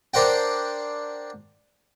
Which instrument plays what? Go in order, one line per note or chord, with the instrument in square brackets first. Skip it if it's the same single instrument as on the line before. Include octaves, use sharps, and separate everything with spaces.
[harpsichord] D4 A#4 C5 F#5 G5